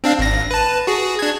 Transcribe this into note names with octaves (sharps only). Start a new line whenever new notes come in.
C4 D4 F5
G#1 A#6
B4 A5
F#4 G#4
D4 G#6